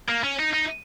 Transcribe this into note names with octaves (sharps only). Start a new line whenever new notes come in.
A#3
C#4
D#4
D#4